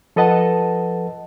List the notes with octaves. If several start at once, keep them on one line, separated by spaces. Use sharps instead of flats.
F3 A4 B4 D#5 F#5 A5